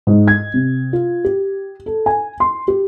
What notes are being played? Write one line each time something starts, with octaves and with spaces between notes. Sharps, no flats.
G#2
G#6
C3
F4
G4
A4
G#5
C6
G4